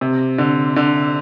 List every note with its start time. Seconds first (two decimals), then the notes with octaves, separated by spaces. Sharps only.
0.01 C3
0.38 D3
0.76 D3